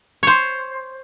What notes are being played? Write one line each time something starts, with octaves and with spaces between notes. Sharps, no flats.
C5 C#5